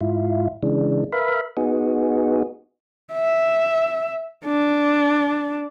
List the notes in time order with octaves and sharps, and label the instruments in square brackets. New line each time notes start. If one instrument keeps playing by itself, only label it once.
[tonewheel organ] G#2 E4 F4
C#3 E3 G#3 D4
A#4 B4 E5 F5 B5
B3 D#4 F#4 G#4
[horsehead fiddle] E5
D4